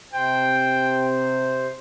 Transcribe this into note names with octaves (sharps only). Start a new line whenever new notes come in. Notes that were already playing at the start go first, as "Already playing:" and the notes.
C3 C5 G5